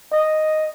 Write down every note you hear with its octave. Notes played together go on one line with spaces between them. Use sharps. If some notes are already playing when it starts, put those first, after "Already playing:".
D#5